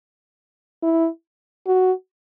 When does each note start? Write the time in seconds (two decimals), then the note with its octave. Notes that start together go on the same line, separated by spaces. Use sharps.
0.83 E4
1.67 F#4